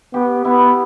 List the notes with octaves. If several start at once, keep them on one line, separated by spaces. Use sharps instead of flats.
B3 G4
B3 E4